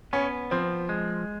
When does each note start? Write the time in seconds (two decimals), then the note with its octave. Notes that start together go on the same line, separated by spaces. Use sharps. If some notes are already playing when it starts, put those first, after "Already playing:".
0.13 B3 C#4
0.51 F3 C4
0.89 G#3